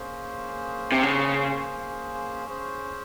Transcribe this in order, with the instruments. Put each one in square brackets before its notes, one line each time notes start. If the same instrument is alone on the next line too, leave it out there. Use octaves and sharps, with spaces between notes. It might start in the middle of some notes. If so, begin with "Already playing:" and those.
Already playing: [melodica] A#3 C#4 G#4 C5
[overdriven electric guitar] C3
C#3
[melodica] C#4 G#4 C5